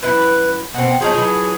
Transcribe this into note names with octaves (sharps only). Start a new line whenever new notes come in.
F#2 E4 B4
B2 C4 F#5
F3 F#3 D#4 G#4
E3 F#3